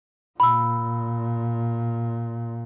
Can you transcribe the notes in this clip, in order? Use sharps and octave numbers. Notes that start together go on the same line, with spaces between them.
A#2 B5 E6